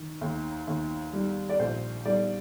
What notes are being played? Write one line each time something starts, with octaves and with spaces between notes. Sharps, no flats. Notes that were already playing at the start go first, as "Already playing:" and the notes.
Already playing: D#3
D#2
D#2
G3
D5
A#1 C5
G3 D5